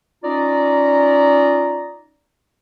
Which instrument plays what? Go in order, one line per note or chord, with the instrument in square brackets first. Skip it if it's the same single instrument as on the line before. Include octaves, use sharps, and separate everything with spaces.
[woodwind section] C#4 D#4 F4 D5 A#5